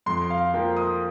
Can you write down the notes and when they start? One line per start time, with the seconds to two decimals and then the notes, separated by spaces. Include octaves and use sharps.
0.06 F2 C6
0.30 F5
0.54 F3 A#3 G5
0.77 D#6